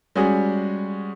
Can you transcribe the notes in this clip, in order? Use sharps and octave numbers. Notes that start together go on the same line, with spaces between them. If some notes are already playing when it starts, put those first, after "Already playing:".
G3 G#3 C#4 F#4 G#4